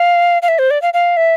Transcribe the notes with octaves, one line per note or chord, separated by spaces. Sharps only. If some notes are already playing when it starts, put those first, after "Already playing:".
Already playing: F5
F5
E5
C5
D5
F5
F5
E5